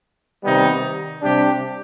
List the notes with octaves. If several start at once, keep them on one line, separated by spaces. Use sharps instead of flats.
C3 D#3 G3 B3 D#4
C3 G3 D4 G4